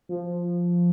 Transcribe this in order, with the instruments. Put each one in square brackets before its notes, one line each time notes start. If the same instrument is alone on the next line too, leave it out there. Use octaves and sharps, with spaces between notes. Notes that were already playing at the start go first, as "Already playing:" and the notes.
[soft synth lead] F3